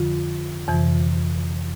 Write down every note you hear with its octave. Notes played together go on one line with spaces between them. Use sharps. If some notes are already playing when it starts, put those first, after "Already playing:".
Already playing: F2 D3 F3 F4
F2 C3 E3